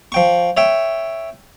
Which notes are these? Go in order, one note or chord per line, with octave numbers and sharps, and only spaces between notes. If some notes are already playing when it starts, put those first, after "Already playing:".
F3 G5 C#6
C#5 E5 G5